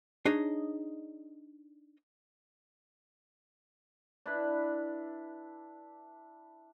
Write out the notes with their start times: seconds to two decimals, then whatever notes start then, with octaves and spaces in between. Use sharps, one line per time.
0.25 D4 D#4 G#4 C#5 D#5
4.26 D4 E4 B4